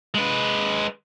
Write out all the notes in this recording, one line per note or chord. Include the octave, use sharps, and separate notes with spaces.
G#3 B4